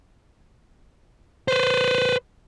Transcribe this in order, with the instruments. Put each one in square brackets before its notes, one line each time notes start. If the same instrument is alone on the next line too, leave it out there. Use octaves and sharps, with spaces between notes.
[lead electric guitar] B4 C5